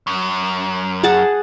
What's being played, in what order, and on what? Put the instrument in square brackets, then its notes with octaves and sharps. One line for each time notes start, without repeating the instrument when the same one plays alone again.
[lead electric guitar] F#2
[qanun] G#4 F#5 A5